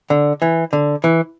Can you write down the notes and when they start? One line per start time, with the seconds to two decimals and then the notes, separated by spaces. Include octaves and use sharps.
0.10 D3
0.42 E3
0.73 D3
1.04 E3